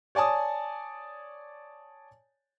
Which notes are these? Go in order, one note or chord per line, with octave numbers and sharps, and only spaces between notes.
C#5 D5 G#5 A5 D#6